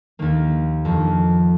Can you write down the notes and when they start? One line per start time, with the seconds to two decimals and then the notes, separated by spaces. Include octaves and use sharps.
0.19 D#2 D#3 A#3
0.85 F2 D#3